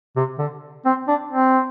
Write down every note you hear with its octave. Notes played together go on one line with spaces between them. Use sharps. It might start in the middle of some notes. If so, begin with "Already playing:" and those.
C3
D3
C4
D4
C4